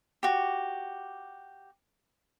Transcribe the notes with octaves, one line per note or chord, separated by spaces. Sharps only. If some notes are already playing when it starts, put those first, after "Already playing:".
F#4 G4